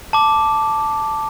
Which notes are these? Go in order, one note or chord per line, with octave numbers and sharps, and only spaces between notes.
A5 D6